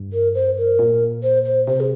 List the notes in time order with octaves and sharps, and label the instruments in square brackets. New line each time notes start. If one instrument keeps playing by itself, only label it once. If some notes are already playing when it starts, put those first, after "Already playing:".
Already playing: [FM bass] G2
[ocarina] A#4
C5
A#4
[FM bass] A#2
[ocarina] C5
C5
[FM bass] C3 [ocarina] C5
[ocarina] G#4